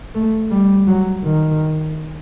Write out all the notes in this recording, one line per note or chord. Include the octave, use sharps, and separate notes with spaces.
A3
G3
F#3
D#3